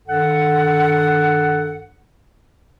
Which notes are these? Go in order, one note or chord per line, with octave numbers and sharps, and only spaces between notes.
G2 D#3 A4 F#5